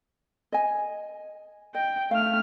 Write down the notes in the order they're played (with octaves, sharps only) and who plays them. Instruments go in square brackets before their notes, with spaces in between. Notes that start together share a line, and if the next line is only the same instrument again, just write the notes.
[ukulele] D#5 G#5
[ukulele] D#5 [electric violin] G5
[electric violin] A3 F6 [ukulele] F5